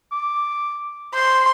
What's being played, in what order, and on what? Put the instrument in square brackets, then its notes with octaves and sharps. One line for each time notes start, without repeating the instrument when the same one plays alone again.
[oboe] D6
[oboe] C5 [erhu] C6